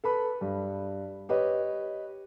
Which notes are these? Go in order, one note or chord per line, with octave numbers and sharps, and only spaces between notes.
A4 B4 B5
G2
G4 B4 C#5 D#5